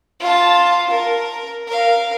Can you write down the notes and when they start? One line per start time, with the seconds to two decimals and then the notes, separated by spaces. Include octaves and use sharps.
0.20 F4 A5
0.90 A#4
1.67 A#4 F5